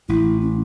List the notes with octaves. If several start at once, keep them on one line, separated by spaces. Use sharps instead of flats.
A1 A2 E4
C#4